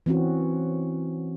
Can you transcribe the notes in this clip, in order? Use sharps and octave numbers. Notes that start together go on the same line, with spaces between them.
E3 C4 C#4 F#4